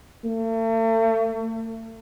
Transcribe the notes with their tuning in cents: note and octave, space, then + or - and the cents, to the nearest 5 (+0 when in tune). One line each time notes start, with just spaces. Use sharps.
A3 +40